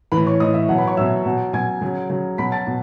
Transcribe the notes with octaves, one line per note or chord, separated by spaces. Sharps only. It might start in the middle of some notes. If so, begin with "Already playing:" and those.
A2 E3 B4 B5
C#5 C#6
A2 E3 D#5 D#6
E5
B2 F#3 F#5
B4 B5
C#5 C#6
B2 F#3 E5 E6
B2 F#3
B2 F#3 G#5 G#6
C#3 F#3
C#3 F#3
B2 F#3 B5 B6
A5 A6
B2